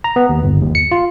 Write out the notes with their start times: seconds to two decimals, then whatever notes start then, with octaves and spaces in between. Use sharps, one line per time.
0.04 A#5
0.16 B3
0.29 D#2
0.44 G1
0.61 D#2
0.75 C#7
0.92 F4